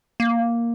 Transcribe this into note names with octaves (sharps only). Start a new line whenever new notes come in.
A#3